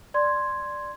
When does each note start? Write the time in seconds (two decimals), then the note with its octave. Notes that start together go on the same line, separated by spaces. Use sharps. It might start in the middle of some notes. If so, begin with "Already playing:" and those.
0.14 D5 C6 G#6